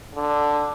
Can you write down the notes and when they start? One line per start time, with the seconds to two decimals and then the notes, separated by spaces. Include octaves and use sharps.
0.15 D3